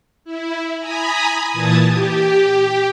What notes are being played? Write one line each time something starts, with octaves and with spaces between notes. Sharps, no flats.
E4
G#5 A#5 B5 D#6
A#2 E3 A5 D#6 G#6 A6
G4